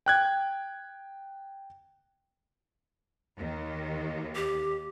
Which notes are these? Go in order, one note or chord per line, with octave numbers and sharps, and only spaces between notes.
G5 F#6 G#6
D#2 D#3
G4